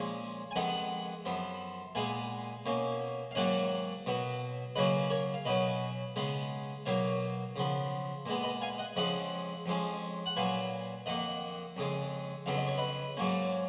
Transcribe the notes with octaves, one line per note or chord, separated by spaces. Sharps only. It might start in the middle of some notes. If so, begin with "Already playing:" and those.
Already playing: A#2 F3 G#3 C#4
G#5
F2 D#3 G#3 B3 D#5 F#5
F#2 F3 B3
A#2 G#3 B3 F5 G#5
B2 A#3 C#4
F5
G#2 D#3 F#3 A#3 C#4 D#5 F#5
B2 F#3 B3
C#3 F#3 A#3 C#4 B4 D#5
A#4 C#5
F5
B2 F#3 C#4 B4 D#5
C#3 G#3 B3
B2 F#3 A#3 C#5 F5
C#3 F3 B3
A#2 G#3 B3
B4 D#5
F5 G#5
D#5 F#5
F2 C#3 F3 G#3 D#5 F#5
F2 F3 G#3 C#4
F#5
A#2 F#3 B3 F5 G#5
F2 D#3 A#3 D#5 F#5
F2 C#3 G#3
F2 C#3 F#3 B3 F5
D#5
C#5
B4 D#5
G#2 F#3 A#3 C#4